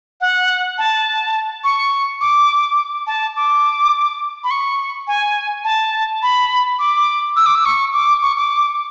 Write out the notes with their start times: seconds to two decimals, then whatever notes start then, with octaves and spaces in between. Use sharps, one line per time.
0.21 F#5
0.78 A5
1.64 C#6
2.21 D6
3.07 A5
3.36 D6
4.44 B5
4.51 C#6
5.07 G#5
5.64 A5
6.22 B5
6.79 D6
7.36 E6
7.46 D6
7.55 E6
7.65 C#6
7.93 D6
8.22 C#6
8.37 D6